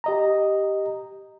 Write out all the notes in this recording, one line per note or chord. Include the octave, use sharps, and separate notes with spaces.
G4 D#5 A#5